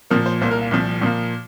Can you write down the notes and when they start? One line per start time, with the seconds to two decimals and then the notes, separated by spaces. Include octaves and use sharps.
0.10 A#2 F3 A#3 A#4
0.26 C5
0.41 C2 A#2 A#3 C5
0.51 A#4
0.61 F4
0.71 C2 A#2 F3
1.02 A#2 F3 A#3